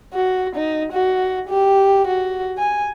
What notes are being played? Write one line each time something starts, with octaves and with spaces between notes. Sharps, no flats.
F#4
D#4
F#4
G4
F#4
G#5